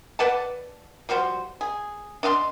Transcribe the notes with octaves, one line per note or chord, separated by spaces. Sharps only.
B4 D5 F#5 A5
F3 G3 F#4 C5
G#4
D4 D#5 F5 C6